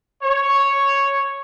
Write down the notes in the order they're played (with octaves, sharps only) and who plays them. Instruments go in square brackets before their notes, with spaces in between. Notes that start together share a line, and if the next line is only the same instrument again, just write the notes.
[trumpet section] C#5